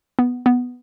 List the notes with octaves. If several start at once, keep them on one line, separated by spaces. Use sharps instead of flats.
B3
B3